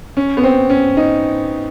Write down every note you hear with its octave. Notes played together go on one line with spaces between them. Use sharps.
C#4
B3
C4
C#4
D#4